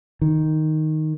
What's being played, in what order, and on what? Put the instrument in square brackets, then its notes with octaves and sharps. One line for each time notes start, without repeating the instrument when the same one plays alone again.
[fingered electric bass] D#3